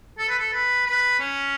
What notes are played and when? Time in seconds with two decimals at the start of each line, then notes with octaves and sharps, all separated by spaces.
0.18 A4
0.29 B4
0.39 A4
0.53 B4
0.87 B4
1.20 C#4